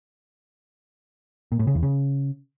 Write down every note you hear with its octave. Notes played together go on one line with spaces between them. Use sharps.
A#2
A2
C#3
E2
C#3